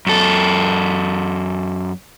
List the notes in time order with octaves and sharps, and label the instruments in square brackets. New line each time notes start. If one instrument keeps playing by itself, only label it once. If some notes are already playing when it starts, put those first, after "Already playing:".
[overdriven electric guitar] F#2 A4